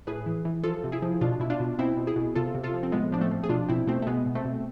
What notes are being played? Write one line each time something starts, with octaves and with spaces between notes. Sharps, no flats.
A2 G#4 B4
E3
E3
F3 F4 A4
C3
E4 G#4
F3
B2 D4 F4
B2 E4
D4 F4
B2
B2 C4 E4
B2
E4 G#4
B2
C3 F4 A4
C3
F4 A4
F3
C4
A2 G#3 B3
F3 D4
A3 C4
F3
G#4
B2 D4 F4
B2 C4 E4
B2 A3 C4
A3
B2 G#3 B3
B2
A3 C4
B2